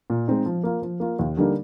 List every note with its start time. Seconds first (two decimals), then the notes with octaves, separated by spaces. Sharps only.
0.10 A#2
0.28 G#3 C4 D#4
0.46 F3
0.64 A#3 F4
0.82 F3
1.00 A#3 F4
1.19 D#2
1.37 D3 G3 A#3 D#4